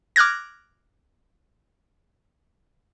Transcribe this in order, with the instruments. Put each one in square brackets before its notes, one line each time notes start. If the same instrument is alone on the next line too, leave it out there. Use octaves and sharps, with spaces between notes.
[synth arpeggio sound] D6 F6 F#6 G#6 A#6